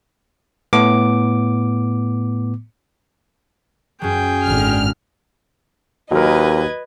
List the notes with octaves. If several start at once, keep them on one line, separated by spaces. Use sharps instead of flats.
A2 B3 D6
F#2 F#3 G#4 G5
G#1 D3 F6
D#2 F#3 A#4 B4 D#5 G#6